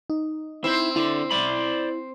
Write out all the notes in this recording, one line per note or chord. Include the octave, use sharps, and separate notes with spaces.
D#4
C4 E4
D3 E4
C5 D5 B5